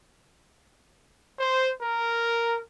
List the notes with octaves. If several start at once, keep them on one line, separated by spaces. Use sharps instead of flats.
C5
A#4